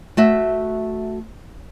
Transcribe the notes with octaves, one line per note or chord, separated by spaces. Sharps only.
A3 F#4 E5